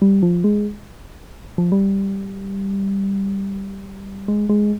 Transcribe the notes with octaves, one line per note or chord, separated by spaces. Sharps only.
G3
F3
G#3
F3
G3
G#3
G#3